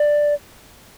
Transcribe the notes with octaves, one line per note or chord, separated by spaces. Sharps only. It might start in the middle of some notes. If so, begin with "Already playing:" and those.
Already playing: D5